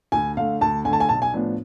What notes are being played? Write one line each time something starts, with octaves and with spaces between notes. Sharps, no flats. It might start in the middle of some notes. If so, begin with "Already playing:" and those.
D2 G#5
D3 A3 F5
D2 A5
D3 A3 G#5 A5
G#5
B1 A5
G#5
A2 F3 B3 D4